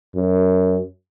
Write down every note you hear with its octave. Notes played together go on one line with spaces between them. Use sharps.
F#2